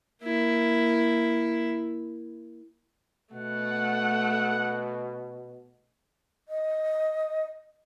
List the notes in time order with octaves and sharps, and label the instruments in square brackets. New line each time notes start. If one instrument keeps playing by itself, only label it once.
[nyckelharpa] A#3 E4
[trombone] B2 [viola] A3 [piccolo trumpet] F#5
[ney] D#5